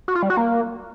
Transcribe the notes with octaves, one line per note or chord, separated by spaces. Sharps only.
F#4
F4
G3
F#4
A#3